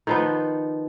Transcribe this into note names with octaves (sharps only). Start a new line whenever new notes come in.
D#3 F3 B3